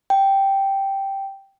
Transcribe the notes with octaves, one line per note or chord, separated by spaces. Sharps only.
G5